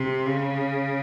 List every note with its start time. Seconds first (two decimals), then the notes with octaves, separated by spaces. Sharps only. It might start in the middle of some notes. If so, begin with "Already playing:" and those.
Already playing: C3
0.26 C#3